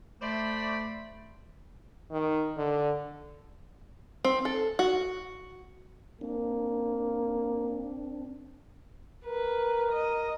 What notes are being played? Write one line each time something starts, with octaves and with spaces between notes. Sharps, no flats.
A3 C5 D5 B5
D#3
D3
C4
A4
F#4
A#3 C4 D4
A#4 B4
D#5